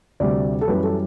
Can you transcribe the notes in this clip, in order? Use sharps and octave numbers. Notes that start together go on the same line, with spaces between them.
D2 C3 G3 D5
A4
F#2 E3 G3 B4
A4